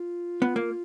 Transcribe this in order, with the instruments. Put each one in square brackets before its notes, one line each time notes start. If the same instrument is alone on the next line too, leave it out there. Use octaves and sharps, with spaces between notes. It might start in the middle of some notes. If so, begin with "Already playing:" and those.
Already playing: [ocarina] F4
[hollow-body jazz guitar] B3
A#3